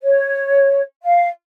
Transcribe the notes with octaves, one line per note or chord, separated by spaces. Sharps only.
C#5
F5